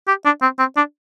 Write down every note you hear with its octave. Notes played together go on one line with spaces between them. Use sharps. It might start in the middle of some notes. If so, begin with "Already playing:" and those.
G4
D4
C4
C4
D4